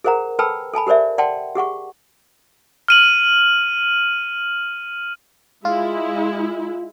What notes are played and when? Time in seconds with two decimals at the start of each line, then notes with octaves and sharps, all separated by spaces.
0.04 G#4 A#4 C5 F#5 A#5
0.39 A4 B4 G5 A5 B5 E6
0.73 A4 G#5 A5 B5
0.87 G4 A#4 C5 D5 E5
1.18 D5 F#5 G5 A5 C6
1.55 G4 G#4 F#5 C#6
2.88 F6 D#7 F#7
5.65 G#3 E4 F4